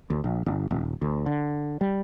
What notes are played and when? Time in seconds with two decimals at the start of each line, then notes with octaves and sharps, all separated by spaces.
0.10 D2
0.24 A#1
0.46 G1
0.71 D#1
1.02 D2
1.26 D3
1.81 G3